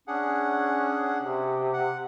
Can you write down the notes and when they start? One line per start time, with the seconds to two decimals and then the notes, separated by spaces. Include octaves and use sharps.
0.08 C#4 D4 G#4 F#5
1.22 C3
1.73 F#5